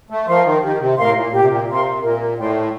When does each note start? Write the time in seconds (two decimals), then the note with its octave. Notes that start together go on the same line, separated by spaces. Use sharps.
0.10 A3
0.27 F3 A#4 F5 C6
0.45 D#3
0.62 D#3 G4
0.79 C3
0.97 A2 A#4 F5 C6
1.15 A#2
1.32 A#2 G4
1.41 C3
1.48 A#2
1.68 C3 A#4 F5 C6
2.03 A#2 A#4
2.37 A2 D5 G5 C6